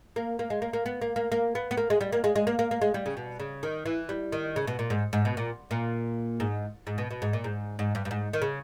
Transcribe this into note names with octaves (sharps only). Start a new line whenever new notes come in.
A#3
A#3
G#3
A#3
A#3
B3
A#3
A#3
A#3
B3
B3
A#3
G#3
G3
A#3
G#3
G#3
A#3
A#3
A#3
G#3
G3
C#3
B2
C#3
D#3
E3
G3
D#3
C#3
B2
A#2
G#2
G#2
B2
A#2
A#2
G#2
G#2
B2
B2
G#2
A#2
G#2
G#2
G2
G2
G#2
D#3
C#3